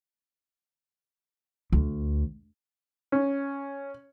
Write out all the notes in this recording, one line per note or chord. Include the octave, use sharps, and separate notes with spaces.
D2
C#4